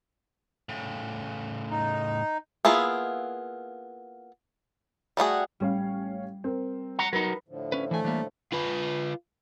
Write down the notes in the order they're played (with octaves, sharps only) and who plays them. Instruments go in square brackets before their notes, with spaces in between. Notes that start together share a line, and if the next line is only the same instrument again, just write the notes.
[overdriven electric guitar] A2 C#3
[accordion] D#4
[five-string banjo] A#3 B3 E4 F4 G#4
G3 A3 F#4 G#4
[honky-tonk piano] A1 C#4 F5 [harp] G3
[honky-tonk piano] C4 A#4
[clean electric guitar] F#5 A#5
[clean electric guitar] F#3 D#4 [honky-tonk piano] A#4 [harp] B4 A#5
[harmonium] A2 D3 F3
[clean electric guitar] C#4 B4
[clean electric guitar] E3 G#5 [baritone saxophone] A3
[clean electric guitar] E3 G3 A#3
[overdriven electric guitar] F4 B4